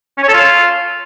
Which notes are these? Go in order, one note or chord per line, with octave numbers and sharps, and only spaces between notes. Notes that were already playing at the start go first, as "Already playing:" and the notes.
C#4
C#5
A4
F4